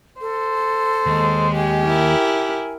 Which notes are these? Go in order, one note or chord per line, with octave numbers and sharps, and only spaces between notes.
A4 C5
D#2 G#3
G4 G#5
E4 A#4